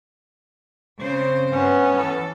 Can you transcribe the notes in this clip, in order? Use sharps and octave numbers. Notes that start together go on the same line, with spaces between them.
C#3 C4 C5
G2 B3 C#4
E3 A4